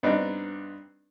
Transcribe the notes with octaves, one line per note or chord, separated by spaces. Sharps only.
G2 B3 C4 D4 D#4